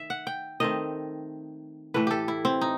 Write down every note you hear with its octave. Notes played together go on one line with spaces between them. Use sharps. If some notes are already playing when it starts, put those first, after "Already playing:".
Already playing: D#3 E5
F#5
G5
D#3 A3 C4 D#5
A2 E3 A3 B4
G4 A4
E4
C4
D#4